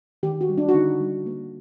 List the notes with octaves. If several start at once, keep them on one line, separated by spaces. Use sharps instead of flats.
D#3 G4
F#4
G3
D4
F#4
D3 D#4
G3
A#3